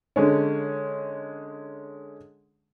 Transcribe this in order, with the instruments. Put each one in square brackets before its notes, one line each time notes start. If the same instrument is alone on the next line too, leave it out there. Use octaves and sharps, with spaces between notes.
[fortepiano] D3 G#3 C#4